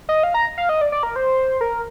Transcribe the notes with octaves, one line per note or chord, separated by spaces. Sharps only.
D#5
F5
A#5
F5
D#5
D5
D5
A#4
C5
A#4